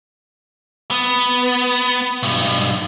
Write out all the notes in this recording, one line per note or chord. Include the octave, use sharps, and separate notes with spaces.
B3
B1 G2